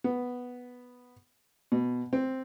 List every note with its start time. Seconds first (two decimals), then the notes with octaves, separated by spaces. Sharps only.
0.04 B3
1.72 B2
2.13 C4